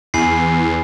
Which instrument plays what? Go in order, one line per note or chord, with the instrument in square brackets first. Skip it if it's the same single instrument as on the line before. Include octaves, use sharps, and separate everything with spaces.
[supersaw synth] E2 [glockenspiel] G#5 B5 C7